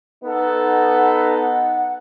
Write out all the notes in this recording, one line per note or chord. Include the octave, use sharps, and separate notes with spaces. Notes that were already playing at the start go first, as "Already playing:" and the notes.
B3 D#4 A4 F#5